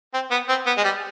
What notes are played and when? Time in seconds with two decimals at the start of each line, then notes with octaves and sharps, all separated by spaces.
0.14 C4
0.31 B3
0.49 C4
0.67 B3
0.77 G#3
0.84 G3